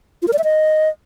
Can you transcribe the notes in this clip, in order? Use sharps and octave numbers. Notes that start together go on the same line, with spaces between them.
F4
A#4
D5
E5
D#5